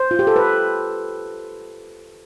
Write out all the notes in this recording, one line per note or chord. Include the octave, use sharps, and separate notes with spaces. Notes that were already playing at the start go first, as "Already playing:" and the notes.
Already playing: C5
F4
G4
A4
B4